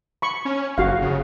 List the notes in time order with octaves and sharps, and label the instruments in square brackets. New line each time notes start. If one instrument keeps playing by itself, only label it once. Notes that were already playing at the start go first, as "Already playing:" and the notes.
[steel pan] B5 C#6
[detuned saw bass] C#4
[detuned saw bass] F#1 [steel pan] F#4 F5
[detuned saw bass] C#3